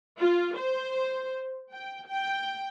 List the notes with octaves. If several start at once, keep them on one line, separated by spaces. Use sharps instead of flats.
F4
C5
G5
G5